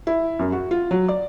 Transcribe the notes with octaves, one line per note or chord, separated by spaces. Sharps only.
E4
F#2
F#4
F4
F#3
D5